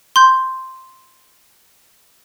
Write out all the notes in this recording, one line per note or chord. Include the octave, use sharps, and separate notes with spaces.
C6 G6